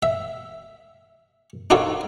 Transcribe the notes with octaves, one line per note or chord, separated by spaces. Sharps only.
E5
D4 D#4 F4 F#4 A4 C#5